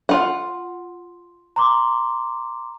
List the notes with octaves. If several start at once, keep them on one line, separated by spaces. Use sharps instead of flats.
F4 F#5
A#5 C6 D6